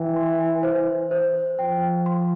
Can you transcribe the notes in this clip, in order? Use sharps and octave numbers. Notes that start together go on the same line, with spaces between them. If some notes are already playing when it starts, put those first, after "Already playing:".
Already playing: E3 G5
C6
C5
C5
F3 G5
C6